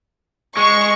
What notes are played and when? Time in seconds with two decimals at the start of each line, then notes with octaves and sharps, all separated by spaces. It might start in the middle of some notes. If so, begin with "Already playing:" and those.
0.57 G#3 C#6